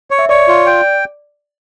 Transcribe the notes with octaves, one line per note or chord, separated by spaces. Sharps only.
C#5
E5
C#5 D5
F4
G5